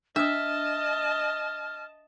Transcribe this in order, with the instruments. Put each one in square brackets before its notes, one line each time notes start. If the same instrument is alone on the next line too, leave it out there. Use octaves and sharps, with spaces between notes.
[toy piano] D4 D#6 [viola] D#5 A5 [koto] E5 [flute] F6